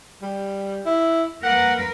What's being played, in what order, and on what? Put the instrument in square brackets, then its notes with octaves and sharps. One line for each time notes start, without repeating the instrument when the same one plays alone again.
[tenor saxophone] G3
E4
[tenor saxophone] A#3 [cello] A#4 B4 [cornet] F#5